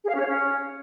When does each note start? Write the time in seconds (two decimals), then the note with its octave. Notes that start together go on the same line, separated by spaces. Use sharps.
0.03 G#4
0.08 F5
0.14 C#4
0.19 C#5
0.25 C#4